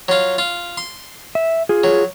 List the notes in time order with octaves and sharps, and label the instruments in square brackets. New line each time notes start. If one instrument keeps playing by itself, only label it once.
[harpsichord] F#3 F4
F4
C6
[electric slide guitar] E5
F4 G#4
[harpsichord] F#3